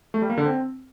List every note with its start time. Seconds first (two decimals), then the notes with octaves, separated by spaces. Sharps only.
0.14 A3
0.22 G3
0.30 A#3
0.37 D3
0.45 C4